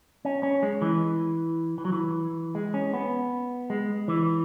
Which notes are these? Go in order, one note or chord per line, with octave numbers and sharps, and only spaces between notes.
C#4
C#4
G#3
E3
E3
F#3
E3
G#3
C#4
B3
G#3
E3